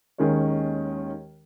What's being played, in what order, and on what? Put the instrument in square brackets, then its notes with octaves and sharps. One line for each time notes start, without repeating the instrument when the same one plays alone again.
[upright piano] D#2 D#3 G#3 C#4 A#4 C#5